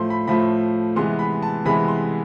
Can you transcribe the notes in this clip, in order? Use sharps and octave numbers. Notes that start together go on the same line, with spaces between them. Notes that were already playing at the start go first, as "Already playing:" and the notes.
Already playing: A2 F3 A3 C6
B5
A2 F3 A3 B5
C3 E3 G#3 B3 C6
B5
A5
C3 E3 G#3 B3 B5
C6